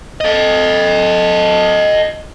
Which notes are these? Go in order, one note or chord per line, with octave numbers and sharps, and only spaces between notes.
A4 D#5